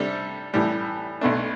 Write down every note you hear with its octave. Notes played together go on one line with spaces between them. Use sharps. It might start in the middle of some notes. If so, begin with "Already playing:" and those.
Already playing: C3 G3 D4 A4
A2 E3 G3
B1 B2 A3 D4